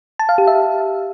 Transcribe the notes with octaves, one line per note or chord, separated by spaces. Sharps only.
A5
F5
G4
E5